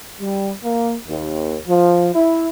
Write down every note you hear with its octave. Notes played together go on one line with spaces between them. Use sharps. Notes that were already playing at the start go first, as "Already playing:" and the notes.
G3
A#3
D#2
F3
E4